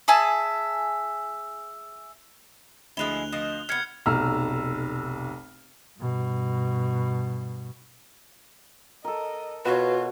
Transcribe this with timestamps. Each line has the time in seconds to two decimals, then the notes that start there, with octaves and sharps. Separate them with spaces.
0.08 G#4 E5 G#5 A5
2.97 D2 F3 G#3 E4 F#6 F7 G7
3.32 F3 C5 D#5
3.69 C3 B3 F6 G#6 C#7
4.06 F1 B1 A#5 E6 F6
6.00 G2 B2
9.05 A4 A#4 D#5
9.66 B2 F4 F#4 B4 C#5